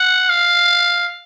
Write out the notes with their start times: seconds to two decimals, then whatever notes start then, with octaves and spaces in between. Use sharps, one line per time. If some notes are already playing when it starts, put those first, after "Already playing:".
Already playing: F#5
0.29 F5